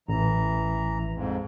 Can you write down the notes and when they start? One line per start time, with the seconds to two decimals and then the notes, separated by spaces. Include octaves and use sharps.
0.09 A1 E3 A#5
1.13 F2 G#2